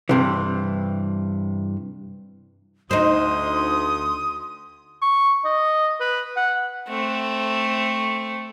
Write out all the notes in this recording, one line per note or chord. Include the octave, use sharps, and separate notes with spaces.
G2 C3 E3
D2 D#4 C5 C6 D#6
C#6
D#5
B4
F#5
A3 C4